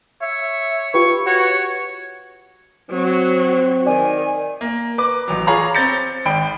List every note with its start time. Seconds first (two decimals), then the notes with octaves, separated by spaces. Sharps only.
0.22 C#5 E5
0.94 F4 G4 B4 C#6
1.26 F#4 C#5
2.91 F#3 C4
3.86 D#3 D5 G#5
4.61 A#3
4.98 B4 D6
5.28 A1 F#3
5.47 F4 G#4 C#5 F5 A#5 B5
5.75 C4 G6 A6 C#7
6.25 G#1 G5 B5 D7